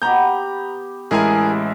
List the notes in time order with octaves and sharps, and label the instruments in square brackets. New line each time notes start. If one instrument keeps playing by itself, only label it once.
[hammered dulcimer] B3 G4 [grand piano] A#5 G6
[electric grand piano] A1 G#3 E4 [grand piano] G#4 A#4 G#5